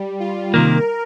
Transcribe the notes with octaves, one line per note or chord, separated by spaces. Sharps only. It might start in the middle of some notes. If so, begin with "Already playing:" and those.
Already playing: G3
F4
C3 D#3 A#3 A#4